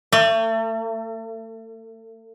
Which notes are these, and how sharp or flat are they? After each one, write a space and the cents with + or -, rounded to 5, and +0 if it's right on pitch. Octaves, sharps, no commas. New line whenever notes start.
A3 +35